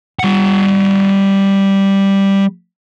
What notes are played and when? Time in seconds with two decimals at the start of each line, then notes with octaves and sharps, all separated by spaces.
0.19 G3 F#5